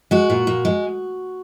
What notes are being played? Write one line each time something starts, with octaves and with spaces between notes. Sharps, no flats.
G#3 F#4
A#2
A#2
G#3